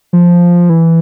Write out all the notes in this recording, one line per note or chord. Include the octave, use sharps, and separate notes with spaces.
F3
E3